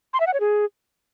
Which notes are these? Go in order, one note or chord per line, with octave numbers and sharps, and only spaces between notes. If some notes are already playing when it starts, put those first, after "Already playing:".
C6
E5
F#5
C#5
G#4